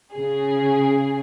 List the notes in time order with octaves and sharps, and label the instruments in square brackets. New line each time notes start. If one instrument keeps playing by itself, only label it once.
[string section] C#3 G#4